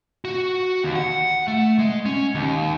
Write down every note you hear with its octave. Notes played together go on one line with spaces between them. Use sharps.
F#4
D#2
F#5
A3
G#3
C#4
D#2